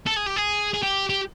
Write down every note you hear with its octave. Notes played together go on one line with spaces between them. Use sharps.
A4
G#4
G4
G#4
G#4
G4
G4